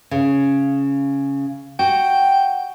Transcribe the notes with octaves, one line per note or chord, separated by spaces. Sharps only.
C#3
F#4 G5